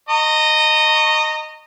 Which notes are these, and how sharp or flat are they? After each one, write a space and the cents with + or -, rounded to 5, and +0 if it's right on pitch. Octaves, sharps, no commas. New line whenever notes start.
D#5 -10 A#5 -35 C#6 +0